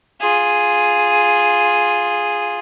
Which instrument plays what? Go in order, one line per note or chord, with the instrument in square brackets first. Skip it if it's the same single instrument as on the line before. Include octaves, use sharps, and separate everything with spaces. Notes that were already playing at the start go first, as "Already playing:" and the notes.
[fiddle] F4 G#4